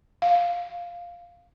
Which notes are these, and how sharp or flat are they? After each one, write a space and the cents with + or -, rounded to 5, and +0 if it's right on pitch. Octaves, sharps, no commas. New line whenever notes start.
F5 +0